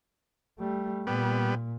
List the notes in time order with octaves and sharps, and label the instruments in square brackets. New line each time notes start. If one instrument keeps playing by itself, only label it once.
[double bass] G3 A3
[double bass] A#2 [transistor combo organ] G3 B3